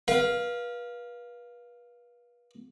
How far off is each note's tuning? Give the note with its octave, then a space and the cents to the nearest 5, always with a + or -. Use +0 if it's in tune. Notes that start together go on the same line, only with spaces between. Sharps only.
B4 -35 F5 +0